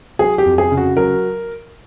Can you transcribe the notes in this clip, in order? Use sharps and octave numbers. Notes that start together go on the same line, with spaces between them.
F#3 G#4
G4
F2
G#4
C#3
F#4
F#3 A#4